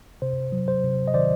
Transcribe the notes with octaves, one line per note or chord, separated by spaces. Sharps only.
C3 C5
F#3
C5
C3
D#5
D#3 C5 D5